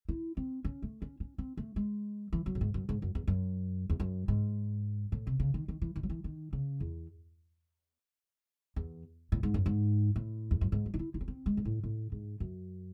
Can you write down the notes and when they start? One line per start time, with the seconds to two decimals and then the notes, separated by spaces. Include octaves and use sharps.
0.09 E4
0.37 C4
0.65 C#4
0.82 A3
1.02 C#4
1.20 C#4
1.38 C4
1.57 A3
1.76 G#3
2.33 E3
2.46 F#3
2.55 A2
2.61 G#2
2.74 F#2
2.89 G#2
3.02 F#2
3.15 E2
3.27 F#2
3.90 E2
4.00 F#2
4.28 G#2
5.12 A2
5.27 C3
5.40 C#3
5.54 D#3
5.68 D#3
5.82 E3
5.96 D#3
6.03 F#3
6.10 E3
6.24 D#3
6.53 C#3
6.80 E2
8.76 E2
9.32 A2
9.43 G#2
9.54 F#2
9.66 G#2
10.16 A2
10.51 E2
10.61 F#2
10.72 G#2
10.86 F#3
10.94 D#4
10.99 E4
11.14 D#4
11.21 C#4
11.28 C4
11.46 G#3
11.57 G#2
11.65 A2
11.83 A2
12.12 G#2
12.40 F#2